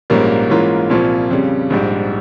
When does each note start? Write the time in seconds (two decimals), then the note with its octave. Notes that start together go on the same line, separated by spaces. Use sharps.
0.10 A#1 G#2 G3 A#3 C#4
0.50 G#2 E3 A#3 C#4 F4
0.90 C2 A#2 F3 C4
1.31 F2 C#3 G3
1.70 A#1 G#2 G3